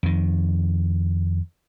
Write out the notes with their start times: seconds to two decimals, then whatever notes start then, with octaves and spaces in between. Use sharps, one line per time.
0.03 F2 D#3